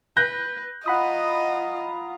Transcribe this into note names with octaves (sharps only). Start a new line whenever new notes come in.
B4 F#6 G6 A#6
F4 D#5 F#5 A#5 B5 D#6